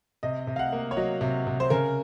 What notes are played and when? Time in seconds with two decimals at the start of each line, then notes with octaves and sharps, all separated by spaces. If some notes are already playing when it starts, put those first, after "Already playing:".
0.23 C3 D#5
0.47 C3
0.56 F5
0.59 F#5
0.72 A#3
0.91 C#5
0.97 F#3 D#5
1.21 C3
1.47 C3
1.60 C5
1.70 C#3 A#4